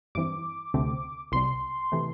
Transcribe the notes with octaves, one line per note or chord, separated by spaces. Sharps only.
G2 E3 C4 D6
D2 C3 A3 C4
C2 C3 G3 C6
C3 E3 A3